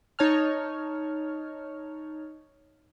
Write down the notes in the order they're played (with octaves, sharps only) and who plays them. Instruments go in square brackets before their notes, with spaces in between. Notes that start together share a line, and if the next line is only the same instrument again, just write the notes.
[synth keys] D#4 C#5 A5 F6